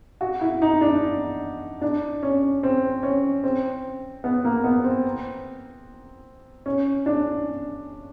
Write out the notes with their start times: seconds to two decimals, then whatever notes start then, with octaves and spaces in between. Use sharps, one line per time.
0.21 F#4
0.41 E4
0.62 D#4
0.81 D4
1.82 D4
2.23 C#4
2.63 C4
3.03 C#4
3.44 C4
4.24 B3
4.45 A#3
4.64 B3
4.84 C4
6.66 C#4
7.06 D4